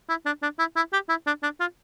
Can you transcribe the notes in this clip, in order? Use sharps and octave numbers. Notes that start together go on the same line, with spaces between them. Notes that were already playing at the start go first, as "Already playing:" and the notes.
E4
D4
D4
E4
E4
G4
E4
D4
D4
F4